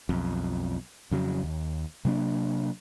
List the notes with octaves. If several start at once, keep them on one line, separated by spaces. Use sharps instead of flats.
B1 F2
F2 C#3 F#3
D#2
C3 F#3 A#3 D4